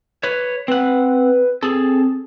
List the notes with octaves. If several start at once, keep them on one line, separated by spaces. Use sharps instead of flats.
B4 C#5
C4 B4 F#5
C4 G#4 A4